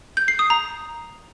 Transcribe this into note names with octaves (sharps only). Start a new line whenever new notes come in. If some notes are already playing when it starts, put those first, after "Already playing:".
G6
C7
D#6
A#5